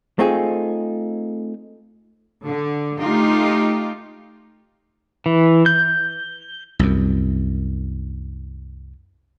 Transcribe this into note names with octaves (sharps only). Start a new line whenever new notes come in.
A3 C4 D#4 F4 G#4
D3
A3 D#4 F4 G4
E3
G6
C2 F#2